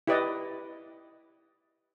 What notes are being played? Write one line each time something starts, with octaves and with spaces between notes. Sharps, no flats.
E4 G4 B4 D5 D#5